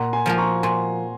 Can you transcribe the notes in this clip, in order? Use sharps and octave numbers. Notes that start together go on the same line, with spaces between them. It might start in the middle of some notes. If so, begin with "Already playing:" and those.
Already playing: A#2 F#5 A#5
G#5 C6
F3 A#3 F4
A#5 C#6
A#2 G#5 C6